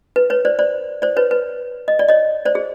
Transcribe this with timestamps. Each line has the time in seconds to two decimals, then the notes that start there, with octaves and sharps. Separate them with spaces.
0.16 B4
0.30 B4 C#5
0.45 C5 D5
0.59 C5 D5
1.02 C5 D5
1.17 B4 C#5
1.31 B4
1.88 D#5
1.99 D5
2.08 C#5 D#5
2.45 C5 D5
2.55 G#4